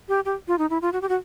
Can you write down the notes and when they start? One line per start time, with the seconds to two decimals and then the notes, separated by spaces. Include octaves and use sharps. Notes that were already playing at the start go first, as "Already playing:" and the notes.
0.09 G4
0.25 G4
0.48 F4
0.58 D#4
0.70 E4
0.82 F4
0.93 F#4
1.02 G4
1.09 F#4